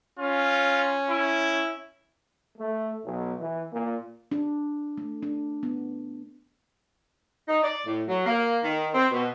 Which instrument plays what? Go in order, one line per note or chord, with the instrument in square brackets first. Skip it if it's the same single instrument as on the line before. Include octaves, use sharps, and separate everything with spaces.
[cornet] C#4 [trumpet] F4
[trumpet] E4
[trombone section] A3
B1
E3
A#2
[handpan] D4
A3
D4
B3
[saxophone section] D#4
D5
A2
F#3
A#3
D#3
C4
B2